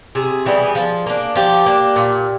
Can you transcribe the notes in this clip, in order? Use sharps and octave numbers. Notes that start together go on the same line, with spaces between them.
C3 G#4
E3 G3 B3
F3
A#3 D4
F3 G4
A#3 D4
A#2